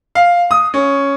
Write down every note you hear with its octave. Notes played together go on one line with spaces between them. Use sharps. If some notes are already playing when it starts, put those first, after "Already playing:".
F5
D#6
C#4